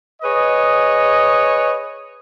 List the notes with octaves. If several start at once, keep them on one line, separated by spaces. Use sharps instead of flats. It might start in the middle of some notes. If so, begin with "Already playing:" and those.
G#4 B4 C#5 D#5